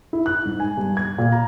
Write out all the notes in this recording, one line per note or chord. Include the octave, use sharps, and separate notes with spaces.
E4
F#6
G#2
G#5
G2
G#6
A#2
A#5